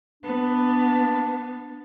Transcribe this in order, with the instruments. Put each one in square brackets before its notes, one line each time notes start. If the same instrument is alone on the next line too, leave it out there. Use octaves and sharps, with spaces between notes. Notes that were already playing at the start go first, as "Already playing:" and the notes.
[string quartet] B3 [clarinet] D4